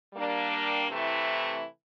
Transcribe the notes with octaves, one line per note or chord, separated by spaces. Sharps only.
G3 A#3 D4
C3 E3 A3 E4